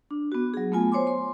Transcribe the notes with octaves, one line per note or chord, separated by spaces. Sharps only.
D4
B3 F#4
F#3 G#4
A3 B3 F4 G#5
C5 C#5 G#5 C6 D6
C6